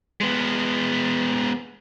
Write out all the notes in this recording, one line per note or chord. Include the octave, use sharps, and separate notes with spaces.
G#3 B3